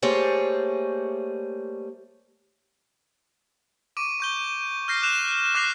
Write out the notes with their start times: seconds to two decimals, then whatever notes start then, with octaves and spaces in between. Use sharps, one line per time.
0.02 G3 A3 A#3 G#4 C5 C#5
3.97 C#6 D6 D7 D#7
4.20 C#6 G6 G7
4.88 F6 G6 A#6 C7
5.02 D6 F#6 E7 F7
5.55 D6 F6 F#6 A#6 C7 F7